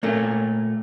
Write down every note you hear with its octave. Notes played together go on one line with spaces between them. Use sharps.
A#2 A3 A#3